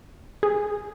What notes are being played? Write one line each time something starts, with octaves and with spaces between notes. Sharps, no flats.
G#4